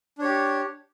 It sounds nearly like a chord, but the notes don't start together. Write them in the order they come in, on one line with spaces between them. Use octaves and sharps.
D4 C#5 G4